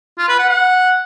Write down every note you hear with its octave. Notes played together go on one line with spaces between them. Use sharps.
F4
B4
F#5
F#5